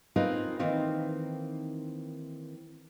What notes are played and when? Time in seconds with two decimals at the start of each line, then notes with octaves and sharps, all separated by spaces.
0.16 C4 D#4 F4 G#4 A#4 B4
0.59 D#3 E3 A#3 C4 D#4